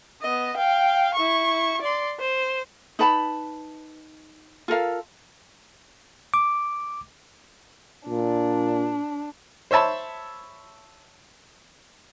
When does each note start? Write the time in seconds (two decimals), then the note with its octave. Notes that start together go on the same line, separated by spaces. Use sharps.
0.21 B3 D#5
0.57 F5 G5
1.14 E4 C#6
1.82 D5 C6
2.20 C5
2.99 D#4 B4 A5 B5
4.68 F4 A4 A#4 F5
6.34 D6
8.08 A#2 D4
9.71 C5 C#5 E5 A5 B5